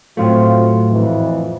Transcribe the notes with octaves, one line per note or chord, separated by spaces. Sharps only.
A2 F#3 A3 C4 F4
F2 E3